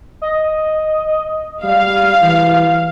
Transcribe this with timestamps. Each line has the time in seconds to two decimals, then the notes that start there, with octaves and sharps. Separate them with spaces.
0.22 D#5
1.63 G3 F5
2.21 E3